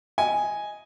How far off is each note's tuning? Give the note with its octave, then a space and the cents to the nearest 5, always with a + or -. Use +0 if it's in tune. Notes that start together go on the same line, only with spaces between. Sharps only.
D#5 +5 G#5 +0